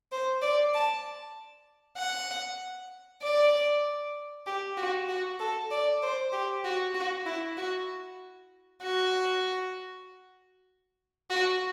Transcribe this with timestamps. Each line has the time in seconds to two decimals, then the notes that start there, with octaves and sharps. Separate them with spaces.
0.12 C5
0.42 D5
0.74 A5
1.98 F#5
3.22 D5
4.46 G4
4.77 F#4
5.09 F#4
5.40 A4
5.71 D5
6.02 C5
6.32 G4
6.65 F#4
6.95 F#4
7.26 E4
7.58 F#4
8.82 F#4
11.30 F#4